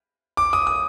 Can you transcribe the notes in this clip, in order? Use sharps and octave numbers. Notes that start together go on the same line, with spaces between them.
D6
D#6
D#6